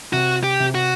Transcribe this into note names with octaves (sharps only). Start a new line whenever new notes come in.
C3 F#4
G4
C3
F#4